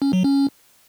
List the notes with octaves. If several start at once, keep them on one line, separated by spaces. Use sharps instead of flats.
C#4
F#3
C#4